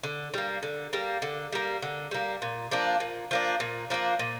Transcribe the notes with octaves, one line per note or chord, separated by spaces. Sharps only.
D3
G3 A#3
D3
G3 A#3
D3
G3 A#3
D3
G3 A#3
A#2
F3 A#3 D4
A#2
F3 A#3 D4
A#2
F3 A#3 D4
A#2